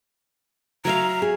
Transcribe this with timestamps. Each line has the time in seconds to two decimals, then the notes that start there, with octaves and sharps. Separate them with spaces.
0.85 F#3 E5 F5 A#5
1.22 G#4